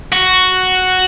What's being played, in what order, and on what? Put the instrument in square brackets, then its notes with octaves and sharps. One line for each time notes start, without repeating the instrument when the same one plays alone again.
[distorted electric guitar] F#4